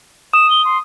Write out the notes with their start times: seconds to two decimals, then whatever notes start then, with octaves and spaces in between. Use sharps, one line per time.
0.33 D#6 E7
0.50 G7
0.65 C6